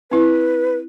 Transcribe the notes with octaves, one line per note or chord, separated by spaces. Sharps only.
C4 E4 B4